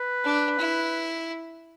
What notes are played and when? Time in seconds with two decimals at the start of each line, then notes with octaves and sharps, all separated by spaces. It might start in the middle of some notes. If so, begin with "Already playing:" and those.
Already playing: B4
0.24 D4
0.59 E4